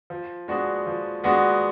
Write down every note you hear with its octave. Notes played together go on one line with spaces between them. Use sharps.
F3
G#3 B3 D4 F#4
F3
G#3 B3 D4 F#4